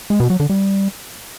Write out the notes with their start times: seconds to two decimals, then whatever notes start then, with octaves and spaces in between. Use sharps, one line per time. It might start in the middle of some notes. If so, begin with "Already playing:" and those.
0.10 G#3
0.20 B2
0.30 F#3
0.40 D3
0.50 G3